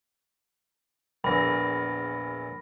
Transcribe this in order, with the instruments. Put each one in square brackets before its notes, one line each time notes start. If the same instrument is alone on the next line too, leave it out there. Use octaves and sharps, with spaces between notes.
[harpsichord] A#1 E2 [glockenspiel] B5 A#6